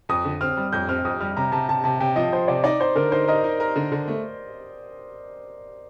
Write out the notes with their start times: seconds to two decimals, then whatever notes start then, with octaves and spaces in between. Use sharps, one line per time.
0.09 F2 D#6
0.25 D3
0.41 C4 F6
0.57 G3
0.72 F2 G6
0.88 C4 F6
1.05 F2 D#6
1.20 G3 F6
1.37 C3 A#5
1.52 C3 A5
1.69 C3 A5
1.84 C3 A5
2.00 C3 G5
2.16 F3 D#5
2.32 F3 C5
2.48 C3 D5
2.64 D#4 D5
2.80 D#4 C5
2.96 D3 A#4
3.12 D#4 C5
3.28 A#4 D#5
3.44 D#4
3.60 A#4
3.76 D3
3.92 D3
4.08 A3